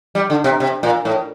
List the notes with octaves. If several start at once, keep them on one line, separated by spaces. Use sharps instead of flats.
G3
D3
C3
C3
A#2
A2